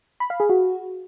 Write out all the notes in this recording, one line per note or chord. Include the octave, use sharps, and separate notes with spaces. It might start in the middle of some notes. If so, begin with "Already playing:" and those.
B5
F5
G#4
F#4